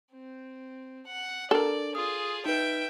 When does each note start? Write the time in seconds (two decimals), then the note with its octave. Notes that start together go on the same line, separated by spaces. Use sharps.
0.12 C4
1.07 F#5
1.51 D4 A4 A#4 D5
1.95 F4 G#4 D#6
2.46 D#4 B4 E5 G5